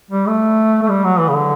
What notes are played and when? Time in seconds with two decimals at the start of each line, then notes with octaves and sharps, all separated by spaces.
0.10 G3
0.27 A3
0.82 A3
0.89 G3
1.04 F#3
1.19 E3
1.28 C#3
1.34 D3